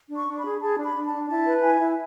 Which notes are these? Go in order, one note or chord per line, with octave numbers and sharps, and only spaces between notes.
D4
C#6
D4
B5
G#4
G#4 A5
D4
B5
D4
A5
D4
E4 A5
B4
E4 G#5
E4